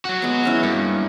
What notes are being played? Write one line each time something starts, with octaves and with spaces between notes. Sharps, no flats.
F#3 F#4
G#3 B3
B3 C#4 E4
G2 A#3